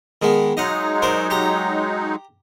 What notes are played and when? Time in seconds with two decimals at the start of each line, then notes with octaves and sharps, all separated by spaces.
0.22 D#3 G#3 B3
0.57 F#3 G#3 D#4 D#5 F5 F#5
1.02 A#4 C5 D5
1.30 G4 A#5